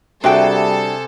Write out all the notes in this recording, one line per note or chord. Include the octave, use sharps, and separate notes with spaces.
C3 G3 D4 F#4 G#4 A4 G5